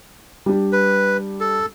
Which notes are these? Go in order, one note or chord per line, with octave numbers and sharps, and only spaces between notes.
G3 D4 G4
B4
A4